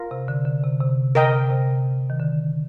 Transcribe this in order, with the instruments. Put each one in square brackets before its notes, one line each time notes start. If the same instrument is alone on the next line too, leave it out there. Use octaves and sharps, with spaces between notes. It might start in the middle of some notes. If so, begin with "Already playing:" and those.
Already playing: [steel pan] F4 A#4
[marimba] C3
D3
D3
C3
C3
[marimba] C3 [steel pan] A#4 D#5 G5
[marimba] C3
D#3
D3